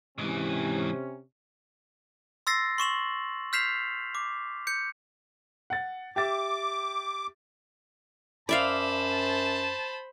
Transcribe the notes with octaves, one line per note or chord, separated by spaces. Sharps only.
G#2 C3 E3 C#4
C6 E6 A6 A#6 C7
C6 C#6 E7 F#7
F6 G6 B6 C7 E7 F7
D6
G6 C#7
F#5 A6
G4 E5 D6 A6
F#2 C5 D5 E5 F5 A5 B5